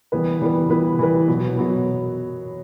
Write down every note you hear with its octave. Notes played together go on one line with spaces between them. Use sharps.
E3 G3 B3 E4 B4
E3 G3 B3 E4 B4
E3 G3 B3 E4 B4
E3 G3 B3 E4 B4
B2 F#3 B3
B2 F#3 B3